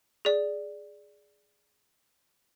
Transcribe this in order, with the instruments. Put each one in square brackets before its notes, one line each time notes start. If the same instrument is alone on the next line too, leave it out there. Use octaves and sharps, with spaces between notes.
[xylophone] G#4 D5